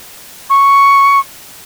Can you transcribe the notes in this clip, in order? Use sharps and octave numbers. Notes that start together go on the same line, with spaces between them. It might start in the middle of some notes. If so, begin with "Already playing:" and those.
C#6